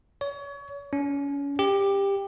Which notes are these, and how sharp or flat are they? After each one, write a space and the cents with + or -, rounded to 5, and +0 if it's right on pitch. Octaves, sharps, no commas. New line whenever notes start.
C#5 +30
C#4 +30
G4 +15